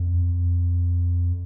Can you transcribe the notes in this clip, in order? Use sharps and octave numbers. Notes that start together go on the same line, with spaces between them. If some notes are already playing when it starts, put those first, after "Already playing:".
Already playing: F2